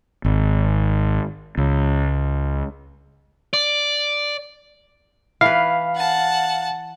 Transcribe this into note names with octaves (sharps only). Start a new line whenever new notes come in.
G#1
C#2
D5
E3 B4 F5
F#5 A5